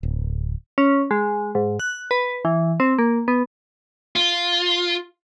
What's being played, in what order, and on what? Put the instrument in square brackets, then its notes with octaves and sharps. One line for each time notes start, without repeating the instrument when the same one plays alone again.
[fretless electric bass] D1
[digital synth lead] C#4
G#3
G#2
F#6
B4
E3
C4
A#3
B3
[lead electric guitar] F4